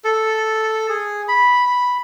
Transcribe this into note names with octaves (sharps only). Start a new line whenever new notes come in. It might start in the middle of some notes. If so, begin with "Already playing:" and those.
A4
G#4
B5
B5